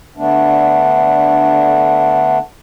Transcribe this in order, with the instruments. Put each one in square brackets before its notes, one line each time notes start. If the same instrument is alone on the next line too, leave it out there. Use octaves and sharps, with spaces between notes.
[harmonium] D3 A3 B3 D4